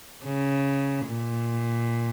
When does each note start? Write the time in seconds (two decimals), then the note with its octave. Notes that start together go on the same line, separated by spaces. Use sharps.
0.24 C#3
1.06 A#2